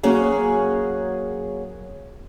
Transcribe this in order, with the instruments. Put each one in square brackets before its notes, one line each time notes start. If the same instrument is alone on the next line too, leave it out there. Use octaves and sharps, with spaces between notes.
[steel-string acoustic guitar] F#3 A#3 C#4 F#4 G#4